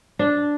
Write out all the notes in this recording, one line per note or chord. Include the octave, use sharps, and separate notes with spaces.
D4